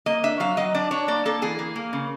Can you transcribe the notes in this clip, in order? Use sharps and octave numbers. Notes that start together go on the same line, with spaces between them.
A#3 D#5
D4 E5
F#3 F5
F#3 D#5
D4 D5
D4 C#5
A#3 D5
A#3 A4
E3 G#4
A#3
A#3
C#3